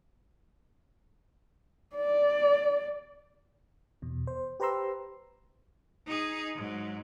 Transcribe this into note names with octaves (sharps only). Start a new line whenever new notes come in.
D5
E2 B2
C5
G4 B4 C5 A#5 C6 E6
D#4 G#4
G#2 F#3